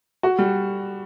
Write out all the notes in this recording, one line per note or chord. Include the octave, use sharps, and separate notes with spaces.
F#4
G3